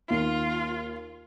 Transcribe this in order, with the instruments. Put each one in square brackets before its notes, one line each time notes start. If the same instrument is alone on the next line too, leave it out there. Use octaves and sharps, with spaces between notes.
[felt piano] D#2 [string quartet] F4